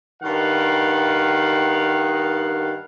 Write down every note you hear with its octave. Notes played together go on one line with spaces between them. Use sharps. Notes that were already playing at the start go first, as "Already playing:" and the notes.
G2 D#3 F5 F#5